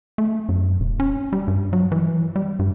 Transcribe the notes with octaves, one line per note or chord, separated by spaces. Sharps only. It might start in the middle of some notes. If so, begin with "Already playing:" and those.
A3
F#2
E1
C#4
G3
G2
F#3
E3
G3
G2